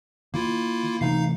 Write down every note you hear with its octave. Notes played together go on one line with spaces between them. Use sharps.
D#3 A#3 E4 F4
C3 E3 A3 D#4 F5 C7